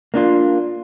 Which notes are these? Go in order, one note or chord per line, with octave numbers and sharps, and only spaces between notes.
A#3 D4 F4